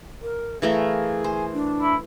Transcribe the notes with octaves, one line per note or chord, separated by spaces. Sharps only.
A#4
E3 A3 G#4 A#4 F5
C5 G#5
D4
E4